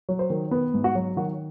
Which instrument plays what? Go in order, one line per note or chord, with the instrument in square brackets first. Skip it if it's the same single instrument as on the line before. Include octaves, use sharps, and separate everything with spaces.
[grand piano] F#3
C5
D#3
B3 B4
G#2
F#4
F#3
D#3 F#4